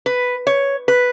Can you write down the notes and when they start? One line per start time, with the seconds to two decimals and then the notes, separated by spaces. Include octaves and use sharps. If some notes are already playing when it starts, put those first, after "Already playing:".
0.06 B4
0.47 C#5
0.88 B4